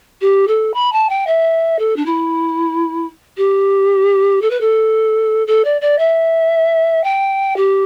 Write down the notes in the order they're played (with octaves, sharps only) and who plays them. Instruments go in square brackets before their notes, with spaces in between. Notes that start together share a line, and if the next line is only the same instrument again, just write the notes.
[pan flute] G4
A4
B5
A5
G5
E5
A4
D4
E4
G4
A4
B4
A4
A4
D5
D5
E5
G5
G4